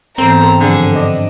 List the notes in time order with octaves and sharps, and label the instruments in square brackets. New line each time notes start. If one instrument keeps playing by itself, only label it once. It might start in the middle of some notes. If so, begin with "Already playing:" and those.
[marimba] G#2 E3 B3 [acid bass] C4 [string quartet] A4 A#5
[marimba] G2 F3 G5 [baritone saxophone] D3 [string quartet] D4 G#4
[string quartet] D4 D#5 [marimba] D6